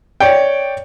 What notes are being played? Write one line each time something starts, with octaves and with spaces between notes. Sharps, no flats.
C#5 D5 G5